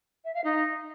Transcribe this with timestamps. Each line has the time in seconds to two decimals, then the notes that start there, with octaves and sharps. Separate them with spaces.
0.25 E5
0.34 F5
0.44 D#4